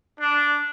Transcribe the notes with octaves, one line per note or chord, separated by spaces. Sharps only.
D4